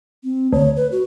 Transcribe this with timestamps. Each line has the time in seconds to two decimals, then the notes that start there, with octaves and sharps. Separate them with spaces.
0.24 C4
0.52 D2 C#5
0.77 B4
0.92 F#4